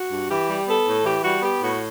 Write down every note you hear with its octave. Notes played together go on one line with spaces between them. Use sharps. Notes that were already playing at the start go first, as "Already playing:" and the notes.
Already playing: F#4
G2
E3 G4
G3
B3 A4
A2
E3 G4
G3 F#4
B3 G4
A2 F#4